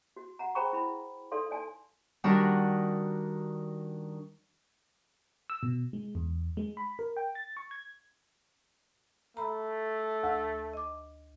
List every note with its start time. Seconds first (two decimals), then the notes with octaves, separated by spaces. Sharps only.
0.16 F#4
0.39 F#5 A#5
0.55 G#4 C5 G5 A#5 B5 C#6
0.73 E4 B5
1.32 D#4 A4 D5 F5 C6
1.51 D5 G#5 A5
2.24 D#3 G3 D4 F#4 A#4
5.50 E6
5.63 B2
5.93 G#3
6.15 E2
6.57 G#3
6.77 B5
6.99 A#4
7.17 G5
7.35 A6
7.57 C#6
7.71 G#6
9.37 A3 A#5 B5
10.23 D2 E6
10.73 D#5 D6